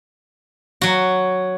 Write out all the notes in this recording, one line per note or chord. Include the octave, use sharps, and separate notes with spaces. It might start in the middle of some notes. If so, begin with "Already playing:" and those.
F#3 F#4